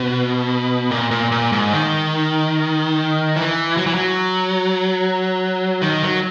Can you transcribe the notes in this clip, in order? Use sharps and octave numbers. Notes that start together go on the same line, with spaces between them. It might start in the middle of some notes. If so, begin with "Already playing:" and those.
Already playing: B2
A#2
A#2
A#2
G#2
D#3
E3
F#3
E3
F#3
D#3
F#3